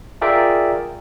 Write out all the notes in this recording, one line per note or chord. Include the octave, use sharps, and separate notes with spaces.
F4 G#4 A#4 D5 E5 G5